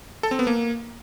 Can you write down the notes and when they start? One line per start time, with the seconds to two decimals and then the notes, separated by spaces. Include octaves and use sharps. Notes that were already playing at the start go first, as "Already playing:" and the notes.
0.23 A4
0.31 C4
0.39 B3
0.47 A#3